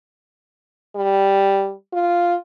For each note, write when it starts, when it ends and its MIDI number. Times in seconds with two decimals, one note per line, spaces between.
0.96 1.72 55
1.93 2.35 65